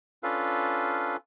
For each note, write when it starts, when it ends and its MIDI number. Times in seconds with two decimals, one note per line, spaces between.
0.23 1.16 61
0.23 1.16 62
0.23 1.16 65
0.23 1.16 69
0.23 1.16 71
0.23 1.16 77